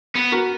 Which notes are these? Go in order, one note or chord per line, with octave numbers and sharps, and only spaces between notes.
B3
F#4 A#4